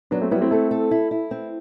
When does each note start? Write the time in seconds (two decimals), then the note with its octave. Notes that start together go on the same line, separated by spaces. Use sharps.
0.11 F#3 B3 D4
0.21 A3 C4
0.31 G3 B3 E4
0.41 A3 C4
0.51 A3 C4 A4
0.71 A4
0.91 E4
1.11 E4
1.31 C4